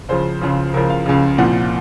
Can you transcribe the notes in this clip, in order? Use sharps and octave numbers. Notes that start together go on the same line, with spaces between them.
C#2 C#3 F3 C5
C#2 C#3 F3
C#2 C#3 F3 A#4
F5
C#2 C#3 F3
C2 A#2 F3 F#5